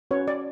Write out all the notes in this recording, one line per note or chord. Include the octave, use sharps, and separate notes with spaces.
C#4 F#4 B4 C#5
D5